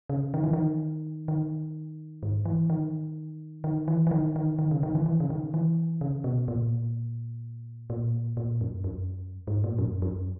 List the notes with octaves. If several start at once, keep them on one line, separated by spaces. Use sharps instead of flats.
C#3
D#3
E3
D#3
D#3
G#2
E3
D#3
D#3
E3
E3
D#3
D#3
D#3
C#3
D#3
E3
E3
C#3
D#3
E3
C#3
B2
A#2
A#2
A#2
F#2
F#2
G#2
A#2
F#2
F#2